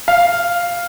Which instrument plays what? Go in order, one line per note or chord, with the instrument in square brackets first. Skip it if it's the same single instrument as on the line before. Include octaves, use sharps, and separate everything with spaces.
[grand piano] F5